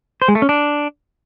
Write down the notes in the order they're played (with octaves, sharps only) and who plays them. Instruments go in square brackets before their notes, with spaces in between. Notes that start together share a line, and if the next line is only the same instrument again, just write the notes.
[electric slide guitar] C5
G#3
A3
C#4
D4